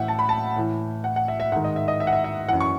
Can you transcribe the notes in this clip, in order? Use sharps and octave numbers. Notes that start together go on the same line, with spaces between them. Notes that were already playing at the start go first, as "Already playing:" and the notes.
Already playing: A2 E3 E5 F#5
A5
B5
A5
A2 E3
F#5
F#5
E5
E5
G#2 D#3 F#5
D#5
E5
D#5
E5
F#5
E5
E5
F#2 E3 F#5
C#6